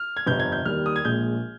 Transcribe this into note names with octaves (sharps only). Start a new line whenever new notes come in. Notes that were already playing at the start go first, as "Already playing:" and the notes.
Already playing: F6
G#6
G1 F2 C3 G6
G#6
G6
D#2 D#3 G3 F6
D#6
G#6
A#1 A#2 G#3 G6